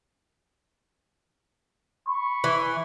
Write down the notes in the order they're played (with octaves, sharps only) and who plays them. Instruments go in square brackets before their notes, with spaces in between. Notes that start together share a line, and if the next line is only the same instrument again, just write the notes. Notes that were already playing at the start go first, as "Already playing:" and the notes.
[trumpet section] B5 C#6
[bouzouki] E3